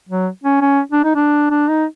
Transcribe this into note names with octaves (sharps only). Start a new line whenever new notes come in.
F#3
C#4
C#4
D4
D#4
D4
D4
D#4